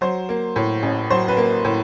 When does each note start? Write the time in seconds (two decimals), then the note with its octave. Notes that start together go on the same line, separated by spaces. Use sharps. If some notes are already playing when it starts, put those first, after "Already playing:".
0.01 F#3 C5
0.29 A#3
0.56 A2
0.83 A1
1.10 F#3 C5
1.28 B4
1.37 A#3
1.65 A2